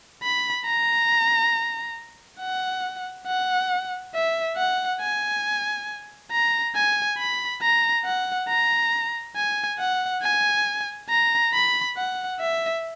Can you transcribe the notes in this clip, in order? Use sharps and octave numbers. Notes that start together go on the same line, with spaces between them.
B5
A#5
F#5
F#5
E5
F#5
G#5
A#5
G#5
B5
A#5
F#5
A#5
G#5
F#5
G#5
A#5
B5
F#5
E5